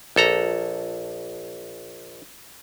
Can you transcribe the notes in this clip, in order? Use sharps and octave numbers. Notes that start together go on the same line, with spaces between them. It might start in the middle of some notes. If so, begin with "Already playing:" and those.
A#1 A4 A#5